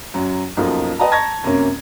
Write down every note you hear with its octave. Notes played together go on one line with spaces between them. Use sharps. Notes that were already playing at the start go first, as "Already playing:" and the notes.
F#2 F#3
B1 F#2 F3 A#3 D#4 F4
B4 D#5 G5 A5 A#5
A5 A#5 C#6 G#6 A#6
F#2 C3 A#3 C#4